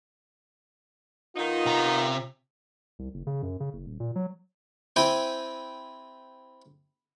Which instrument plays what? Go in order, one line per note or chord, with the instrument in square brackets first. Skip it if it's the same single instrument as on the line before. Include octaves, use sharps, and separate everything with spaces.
[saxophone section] D#3 B3 D#4 [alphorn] F4
[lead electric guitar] C3 A#5
[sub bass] C2
F#1
C#3
F#2
C#3
F#1
D#1
A#2
F#3
[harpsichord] C4 E4 G4 G5 G#5